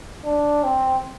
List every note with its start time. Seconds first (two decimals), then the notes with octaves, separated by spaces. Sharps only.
0.25 D4
0.64 C4